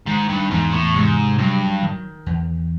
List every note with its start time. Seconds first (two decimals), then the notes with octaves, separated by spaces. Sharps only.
0.07 G#2 D#3
0.29 G2
0.51 E2 G#2
0.73 A2
0.94 G#2 C3
1.39 G2 F#3
1.83 D#3
2.26 E2